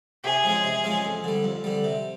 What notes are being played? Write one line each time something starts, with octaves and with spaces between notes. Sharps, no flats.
C3 G#4
F3 G#3 C#4
C3
F3 G#3 C#4
F2
D3 G3
F2
D3 G3
C3